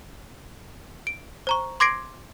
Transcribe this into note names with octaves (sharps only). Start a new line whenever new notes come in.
D7
C5 A#5 C#6
C6 D6 G#6 A#6 C7 D7